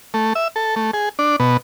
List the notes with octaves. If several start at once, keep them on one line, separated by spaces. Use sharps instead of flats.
A3
E5
A4
A3
G#4
D4
B2